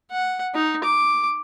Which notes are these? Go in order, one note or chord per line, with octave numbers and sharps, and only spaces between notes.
F#5
D#4
D6